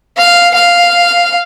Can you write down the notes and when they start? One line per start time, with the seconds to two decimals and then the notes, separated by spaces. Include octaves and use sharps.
0.17 F5
0.55 F5